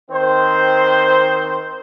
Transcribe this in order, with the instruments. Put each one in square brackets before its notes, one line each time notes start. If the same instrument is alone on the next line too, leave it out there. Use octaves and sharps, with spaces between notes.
[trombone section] D#3 C4 C5